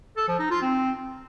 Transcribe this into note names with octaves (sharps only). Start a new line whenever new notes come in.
A4
F3
D#4
F4
C4